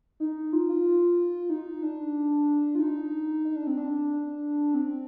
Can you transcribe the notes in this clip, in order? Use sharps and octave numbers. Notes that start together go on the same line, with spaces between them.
D#4
F4
F4
D#4
D4
F4
D#4
D#4
D4
C4
D4
C4